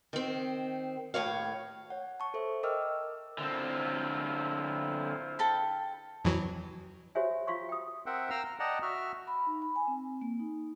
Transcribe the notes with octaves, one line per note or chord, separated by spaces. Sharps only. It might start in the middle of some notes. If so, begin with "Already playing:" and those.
D#3 C4
D#2 A2 C#5 F5
C#5 F#5
A5 C#6
A4 C5 E5
A#4 D#5 G5 D6 E6 F6
D6
D3 C4 E4 F4 C5
A4 G5 B5
F2 E3 F#3
F#4 G4 C5 C#5 E5 G#5
F4 F5 C6 C#6
G5 D#6
C4 A#4 E5 F#5 G5
F5 G5 A#5 E6 F6
F6
D5 D#5 F#5 G5 A5 A#5
F#4 E5 F6
B5
D#4
B5
G#5
C4
A#3
D#4